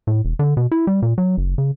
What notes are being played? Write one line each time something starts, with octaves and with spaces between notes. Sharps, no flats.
A2
E1
D3
B2
E4
G3
A#2
F#3
F#1
C#3